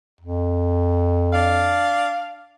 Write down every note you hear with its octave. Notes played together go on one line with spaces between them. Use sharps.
F2
D4 D5 F5